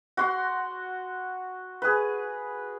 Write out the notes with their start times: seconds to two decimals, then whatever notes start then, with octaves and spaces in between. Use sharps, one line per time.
0.17 F#4 F#5 C6
1.82 G#4 B4